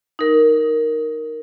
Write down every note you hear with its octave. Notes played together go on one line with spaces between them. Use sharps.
D#4 A#4